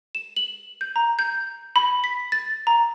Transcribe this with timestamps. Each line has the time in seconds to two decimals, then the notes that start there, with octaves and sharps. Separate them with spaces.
0.15 E7
0.36 F#7
0.81 G6
0.96 A#5
1.19 G6
1.76 B5
2.04 B6
2.32 A6
2.67 A#5